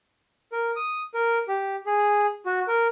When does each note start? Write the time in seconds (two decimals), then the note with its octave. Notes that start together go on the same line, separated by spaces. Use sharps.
0.52 A#4
0.76 D#6
1.14 A#4
1.48 G4
1.86 G#4
2.46 F#4
2.68 A#4